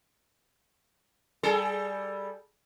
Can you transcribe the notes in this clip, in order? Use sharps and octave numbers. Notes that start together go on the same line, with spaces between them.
G3 G#4 A4